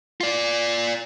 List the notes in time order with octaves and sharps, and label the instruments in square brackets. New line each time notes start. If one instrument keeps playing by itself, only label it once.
[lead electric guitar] F4 D5